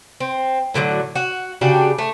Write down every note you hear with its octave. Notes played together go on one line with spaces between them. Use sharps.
C4
A2 D3 F3 F#3
F#4
C#3 D4 F#4 G4
A3